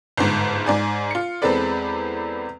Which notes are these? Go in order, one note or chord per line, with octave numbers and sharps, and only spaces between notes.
G1 G#2
G#2 D5 G#5
F4 C#7
E2 G#3 C4 A4 B4 D5